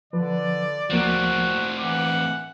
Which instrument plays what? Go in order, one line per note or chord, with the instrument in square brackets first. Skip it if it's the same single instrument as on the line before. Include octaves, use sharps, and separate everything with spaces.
[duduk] D3 [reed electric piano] F3 B4 [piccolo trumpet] D5
[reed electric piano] C#2 F3 A#3 [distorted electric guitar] A2 C4 [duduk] F#4
[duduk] E3 [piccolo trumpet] F#5 [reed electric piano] D6